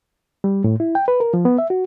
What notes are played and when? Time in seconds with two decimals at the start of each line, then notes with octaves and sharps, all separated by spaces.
0.44 G3
0.64 A2
0.80 E4
0.95 G5
1.08 B4
1.20 A#4
1.34 F3
1.45 B3
1.58 E5
1.70 F#4